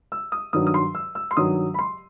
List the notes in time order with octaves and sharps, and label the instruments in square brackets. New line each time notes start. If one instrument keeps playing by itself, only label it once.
[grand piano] E6
D#6
G2 D#3 F#3 D#6
D#6
C6
E6
E6
C6
G2 D#3 F#3 D#6
B5
C6